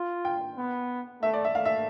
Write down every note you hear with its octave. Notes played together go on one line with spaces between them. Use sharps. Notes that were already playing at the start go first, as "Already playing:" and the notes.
Already playing: F4
G5
B3
A3 E5
D5
E5
A3 F5
E5